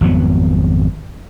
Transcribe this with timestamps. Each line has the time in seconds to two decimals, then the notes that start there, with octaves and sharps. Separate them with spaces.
0.01 G#1 F2 F#3 B3